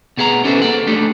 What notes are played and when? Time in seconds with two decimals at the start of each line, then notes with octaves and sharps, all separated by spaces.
0.17 B2 B3 G#4 F#5 A#5
0.44 C#4 G4 A4 B4 C5 E5
0.62 A#3 A4 F#5
0.87 A3 D4 D#4 G4 A4